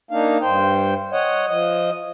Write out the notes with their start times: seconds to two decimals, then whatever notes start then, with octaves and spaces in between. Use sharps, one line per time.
0.11 A#3 D4 D#4 F5
0.42 G2 C5 G5
1.12 C#5 D#5 F#5
1.48 F3 D#5